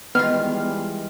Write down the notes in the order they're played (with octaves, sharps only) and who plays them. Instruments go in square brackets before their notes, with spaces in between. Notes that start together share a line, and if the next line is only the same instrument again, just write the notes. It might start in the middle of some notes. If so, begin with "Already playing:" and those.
[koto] D#3 F4 [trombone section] E3 G3 G#3 [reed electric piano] B3 [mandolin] F6